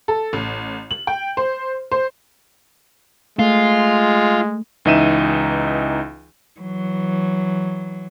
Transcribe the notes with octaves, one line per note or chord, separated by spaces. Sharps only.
A4
A1
F#7
G5
C5
C5
G#3 A3 F4
C#2 E3 D#4 E5 D#7 E7
E3 F#3